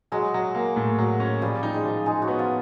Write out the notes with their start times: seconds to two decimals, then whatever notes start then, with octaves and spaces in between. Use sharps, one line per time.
0.12 F#3 G#3 G#4
0.34 F#3
0.55 A#3
0.76 A2
0.99 F#3
1.20 C#4
1.41 F3 G3 G4
1.63 D#4
1.73 G#3 G#4
1.85 F3
2.06 G#3 D#4 G#4
2.22 F#3 F#4
2.28 B3
2.39 F3 F4